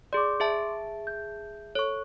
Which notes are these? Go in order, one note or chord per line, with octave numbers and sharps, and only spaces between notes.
G#4 D5 C6 D6
G#4 E5 A5
G6
A4 C#5 C#6